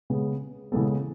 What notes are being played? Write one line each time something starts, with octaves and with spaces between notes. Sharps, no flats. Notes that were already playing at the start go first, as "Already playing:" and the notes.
C#3 G#3 B3
C#3 E3 G#3 B3 A4